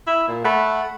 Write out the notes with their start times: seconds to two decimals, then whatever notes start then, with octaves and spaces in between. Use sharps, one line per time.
0.07 E4
0.28 A#2
0.44 A3 F#5 B5